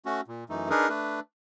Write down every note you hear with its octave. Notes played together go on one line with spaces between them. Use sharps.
A3 C#4 F#4
A#2
F#2 E3 A3 D#4
D4 D#4 G#4 A#4 B4
A3 D4 B4